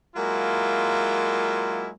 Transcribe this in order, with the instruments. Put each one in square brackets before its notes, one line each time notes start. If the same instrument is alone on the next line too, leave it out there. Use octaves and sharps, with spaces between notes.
[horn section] F#3 G#3 A#3 E4 F4